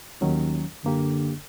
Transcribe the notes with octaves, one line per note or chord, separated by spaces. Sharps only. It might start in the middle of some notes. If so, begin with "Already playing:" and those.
D#2 D#3 F#3 C#4
F#2 D3 A#3 G4